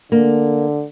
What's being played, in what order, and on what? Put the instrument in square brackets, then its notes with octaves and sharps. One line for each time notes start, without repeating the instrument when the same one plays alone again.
[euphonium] D3 [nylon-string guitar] A#3